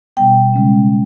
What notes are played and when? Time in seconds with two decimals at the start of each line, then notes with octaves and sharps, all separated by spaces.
0.17 B2 G3 B3 G5
0.54 C#3 G#3 C#4